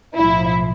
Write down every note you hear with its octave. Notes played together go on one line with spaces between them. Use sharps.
B1 A2 F3 E4